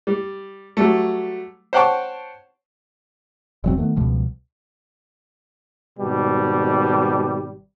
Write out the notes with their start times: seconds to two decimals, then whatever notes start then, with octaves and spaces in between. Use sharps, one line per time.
0.07 G3
0.77 F#3 G3 A3
1.73 C5 C#5 F#5 G5 A5 C#6
3.64 E1 F#3 C4
3.77 D#3 A3 B3
3.96 C#2 B2 F3 G3
5.99 G#1 B2 G3